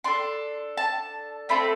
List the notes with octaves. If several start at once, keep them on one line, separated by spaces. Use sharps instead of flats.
D4 A4 C6
A5
A3 C4 F4 A4 B5